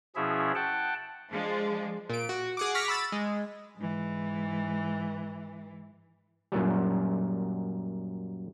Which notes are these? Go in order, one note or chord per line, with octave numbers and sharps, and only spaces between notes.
B2 F3 C#4 E4 G#4 E5
F#5 G5 A5
F3 G#3 D4
A#2 D7
F#4
G#4 F#5 D6
C#6 D6 F6 A#6 B6
B5 E6 A6
G#3
G#2 E3
F#2 A#2 F#3 G3